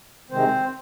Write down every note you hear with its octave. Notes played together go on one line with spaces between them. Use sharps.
C3 D#3 G#3 C4 C5